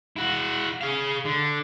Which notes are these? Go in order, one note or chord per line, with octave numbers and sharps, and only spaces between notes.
E4 F#4
G#4 F5
D3